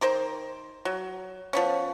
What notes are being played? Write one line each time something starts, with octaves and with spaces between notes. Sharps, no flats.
D#3 A#4 C5
F#3
F3 B3 C#4